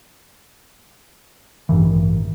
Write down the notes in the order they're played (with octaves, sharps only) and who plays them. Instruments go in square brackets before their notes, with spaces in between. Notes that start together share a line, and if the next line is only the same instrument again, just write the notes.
[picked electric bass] A1 G2 D#3 E3